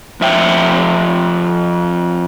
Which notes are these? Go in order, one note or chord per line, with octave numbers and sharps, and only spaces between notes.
F2 E5 G5